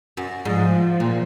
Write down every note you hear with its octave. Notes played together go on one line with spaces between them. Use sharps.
F#2
G#2 F3
A#2